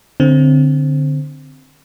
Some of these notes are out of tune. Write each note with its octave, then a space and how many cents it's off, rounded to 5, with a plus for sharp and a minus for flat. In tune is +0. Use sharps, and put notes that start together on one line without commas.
D3 +0 C4 +0